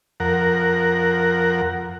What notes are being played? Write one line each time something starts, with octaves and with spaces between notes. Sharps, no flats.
F2 A#4 F#5